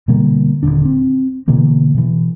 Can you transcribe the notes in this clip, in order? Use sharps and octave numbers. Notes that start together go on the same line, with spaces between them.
B2 D3 G3 A#3
D#1 C2 D3 D4
C4
B2 D3 E3 A#3
B2 E3